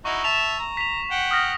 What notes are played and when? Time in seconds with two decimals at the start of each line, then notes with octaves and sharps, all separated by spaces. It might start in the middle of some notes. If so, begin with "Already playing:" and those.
0.05 D#4 E4 F#4 C#6
0.24 E5 A5 E7 F7
0.59 A#5
0.77 B6 F7
1.11 F#5 G5
1.31 D#6 F6 A#6